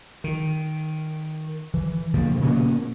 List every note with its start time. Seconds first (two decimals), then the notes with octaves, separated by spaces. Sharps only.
0.24 D#3
1.74 E3
2.14 B2 D3 F3 A#3
2.40 A#2 C#3 A#3 B3